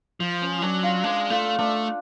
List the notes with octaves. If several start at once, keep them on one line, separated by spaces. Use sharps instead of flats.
F3
C#4
F#3 D4
F4
G#3 D4
A3 F4
A3 D4